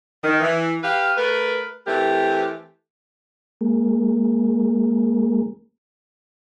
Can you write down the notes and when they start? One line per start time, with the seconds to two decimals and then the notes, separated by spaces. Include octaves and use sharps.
0.23 D#3
0.40 E3
0.83 G4 B4 F5
1.17 A3 A#4 B4
1.87 E3 A3 C4 G4 A#4
3.61 G#3 A#3